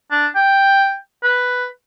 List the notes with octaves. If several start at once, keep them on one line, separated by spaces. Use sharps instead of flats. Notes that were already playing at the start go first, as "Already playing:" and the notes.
D4
G5
B4